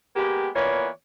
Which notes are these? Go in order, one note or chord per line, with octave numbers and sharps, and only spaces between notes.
G#3 A#3 B3 G4
E3 A#3 B3 F4 C#5 D5